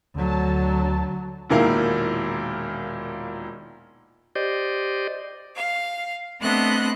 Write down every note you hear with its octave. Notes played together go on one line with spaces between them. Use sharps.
D2 D3 F#3 A5
E1 A#2 D#3 E4 A#4 F5
G4 C5 D5 D#5
F5
A3 B3 C4 D4 D#5 F#6